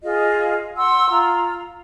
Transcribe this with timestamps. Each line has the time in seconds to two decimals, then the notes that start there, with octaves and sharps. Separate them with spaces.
0.03 F4 G#4 D#5
0.76 F#5 C6 E6
1.10 F4 A#5